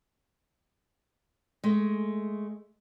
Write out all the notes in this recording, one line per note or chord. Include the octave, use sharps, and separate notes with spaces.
G#3 A3